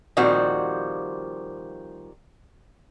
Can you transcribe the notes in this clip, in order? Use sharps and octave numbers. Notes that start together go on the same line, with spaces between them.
A#2 D#3 F3 G3 C4 F#4